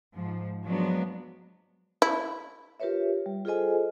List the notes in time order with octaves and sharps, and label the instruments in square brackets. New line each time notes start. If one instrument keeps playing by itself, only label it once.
[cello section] G#2 F3
F3 F#3 G#3 B3 D4
[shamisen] E4
[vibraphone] F4 G4 A#4 B4 C#5 E5
G3
F4 G#4 A4 C5 D#5 G#5